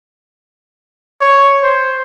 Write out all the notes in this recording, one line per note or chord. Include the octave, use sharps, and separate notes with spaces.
C#5
C5